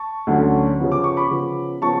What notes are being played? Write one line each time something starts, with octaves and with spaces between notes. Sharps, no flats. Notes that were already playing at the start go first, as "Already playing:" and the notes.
Already playing: A5 C#6
D2 D3 F#3 C#4
C#3 F3 B3
D6
C#6
B5 D6
C#3 F3 B3
C#3 F3 B3 A5 C#6